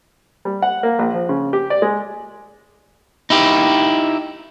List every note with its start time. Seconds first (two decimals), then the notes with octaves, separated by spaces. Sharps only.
0.45 G3
0.62 F#5
0.83 A#3
0.99 A#1
1.14 F3
1.29 C#3
1.53 G4
1.70 D5
1.82 G#3
3.30 D#4 E4 G4